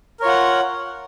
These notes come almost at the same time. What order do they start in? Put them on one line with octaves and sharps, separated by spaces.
A#4 C#5 F4 F#5